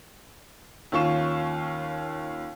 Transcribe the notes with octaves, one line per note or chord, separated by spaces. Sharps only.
D#2 C#4 F4 C#6 E7